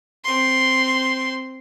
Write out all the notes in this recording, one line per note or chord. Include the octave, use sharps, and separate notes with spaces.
C4 C6